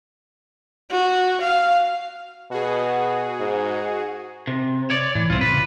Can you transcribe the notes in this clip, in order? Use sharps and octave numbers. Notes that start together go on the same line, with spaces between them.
F#4
F5
B2 F#4 G#4
G#2
C3
C#5 D5
A2 E3
C2 A2 C4 F4
A2 C#3 B4